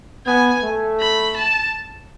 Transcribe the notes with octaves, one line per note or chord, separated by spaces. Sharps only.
B3 G#5
A3
B5
A5